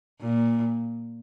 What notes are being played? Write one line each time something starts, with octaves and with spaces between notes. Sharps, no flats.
A#2